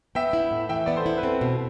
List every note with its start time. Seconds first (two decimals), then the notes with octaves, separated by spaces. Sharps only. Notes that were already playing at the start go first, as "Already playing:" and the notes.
0.15 B3 E5 G5
0.33 E4
0.51 A2
0.69 E3 E5 G5
0.86 B3 D5
0.96 A4 C5
1.06 E4
1.18 B4
1.23 C4 A4
1.41 B2